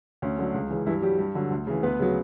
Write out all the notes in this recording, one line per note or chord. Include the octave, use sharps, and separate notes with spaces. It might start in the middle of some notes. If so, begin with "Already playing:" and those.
D2 C#4
D3 F#3
C#2
C#3 E3
G2 E3 E4
F#3 G3 G4
G2
D3 F#3
D2
C#3 E3
D2 B3 B4
C#3 F#3